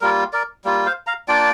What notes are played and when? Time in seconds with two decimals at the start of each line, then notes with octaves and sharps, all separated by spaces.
0.01 G3 A#3 F4 A#4
0.33 A#4 D5
0.65 G3 A#3 F4
0.86 C5 F5
1.07 F5 A#5
1.28 A#3 D4 F4 D5 G5